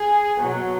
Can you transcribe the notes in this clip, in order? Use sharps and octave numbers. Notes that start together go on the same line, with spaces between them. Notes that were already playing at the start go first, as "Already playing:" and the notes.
Already playing: G#4
B2 F#3